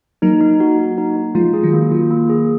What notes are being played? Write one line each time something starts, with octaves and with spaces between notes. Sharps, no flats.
F#3 A#3 D#4
D#4
F#4
F#4
D#4
D#4
F3 G#3 F4
G#4
D#3 F#3
A#3
D#3 F#3 F4
A#3
G#4